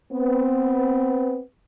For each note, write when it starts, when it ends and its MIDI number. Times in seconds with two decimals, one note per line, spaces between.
0.12 1.41 59
0.12 1.41 60